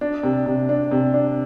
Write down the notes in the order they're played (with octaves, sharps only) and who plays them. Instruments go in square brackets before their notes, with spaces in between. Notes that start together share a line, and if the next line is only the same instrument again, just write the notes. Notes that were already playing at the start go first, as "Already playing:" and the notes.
[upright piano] D4
C3
C3
D4
C3
D4